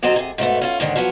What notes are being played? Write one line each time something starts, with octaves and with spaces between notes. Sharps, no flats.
D#2 F#3 C4 A4 D#5 A#5
C3 G#4
G#2 B2 A3 B3
C#4 F4
D#2 G#2 D3 D#3
F3 F#3 B3